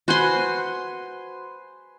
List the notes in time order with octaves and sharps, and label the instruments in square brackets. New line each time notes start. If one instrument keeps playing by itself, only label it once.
[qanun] F#4 C6 [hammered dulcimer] B4 C5 G#5